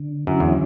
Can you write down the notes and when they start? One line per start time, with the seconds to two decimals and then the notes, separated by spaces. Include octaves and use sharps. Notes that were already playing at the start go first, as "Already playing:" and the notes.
Already playing: D3
0.27 F#2 D3 F#3 C#4 E4
0.40 E2